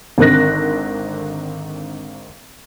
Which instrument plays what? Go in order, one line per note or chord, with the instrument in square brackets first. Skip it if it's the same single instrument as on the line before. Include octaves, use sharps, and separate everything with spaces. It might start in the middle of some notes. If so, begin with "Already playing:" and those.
[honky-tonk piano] G#1 D3 D#3 C4 F#6 A#6